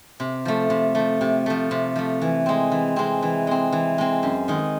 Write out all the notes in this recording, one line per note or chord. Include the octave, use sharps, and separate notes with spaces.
C3
F3 A3
C3
F3 A3
C3
F3 A3
C3
F3 A3
E3
G#3 C4
E3
G#3 C4
E3
G#3 C4
E3
G#3 C4
F#2
D#3 G#3